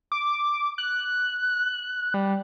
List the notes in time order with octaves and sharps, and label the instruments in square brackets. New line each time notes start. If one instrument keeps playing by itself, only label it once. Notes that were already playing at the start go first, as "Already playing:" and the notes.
[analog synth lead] D6
F#6
G3